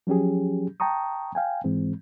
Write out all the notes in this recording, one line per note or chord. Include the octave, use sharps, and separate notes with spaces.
F3 F#3 C#4 G4 G#4
G5 A5 A#5 C#6 D#6
F5 G5 G#5
G#2 E3 G#3 C4